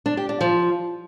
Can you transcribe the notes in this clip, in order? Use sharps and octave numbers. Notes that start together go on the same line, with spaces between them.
D4
G4
D4
F3